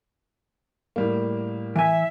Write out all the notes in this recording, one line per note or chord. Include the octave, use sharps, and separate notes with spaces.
A2 G3 A#3
E3 E5 G#5